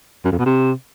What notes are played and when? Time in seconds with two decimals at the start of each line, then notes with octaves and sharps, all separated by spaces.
0.25 F#2
0.32 F2
0.39 B2
0.46 C3